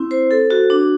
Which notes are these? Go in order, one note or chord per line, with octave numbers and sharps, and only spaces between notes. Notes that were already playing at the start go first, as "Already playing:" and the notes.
Already playing: C4 E4
C5
A4
F#4
D4